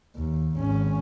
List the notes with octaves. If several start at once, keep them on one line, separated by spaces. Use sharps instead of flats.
D#2
G#1 C#4